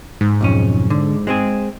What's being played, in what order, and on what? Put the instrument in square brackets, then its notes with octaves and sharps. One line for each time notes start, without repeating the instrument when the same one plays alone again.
[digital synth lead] G#2
[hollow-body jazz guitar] B1 F2 C#4
D3
G#3 C4 G#4